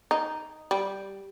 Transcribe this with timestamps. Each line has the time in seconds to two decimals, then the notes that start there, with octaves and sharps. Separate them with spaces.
0.11 D#4
0.71 G3